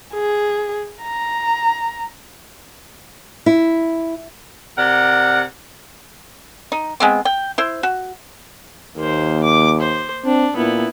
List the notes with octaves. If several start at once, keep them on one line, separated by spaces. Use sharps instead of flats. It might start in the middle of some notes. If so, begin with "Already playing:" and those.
G#4
A#5
E4
C3 A#4 D5 F#5
D#4
G#3 B3 C4
G5
E4 C5
F#4
D#2 A#3 C5
D6
C5
C4 D4
A#2 B3 E4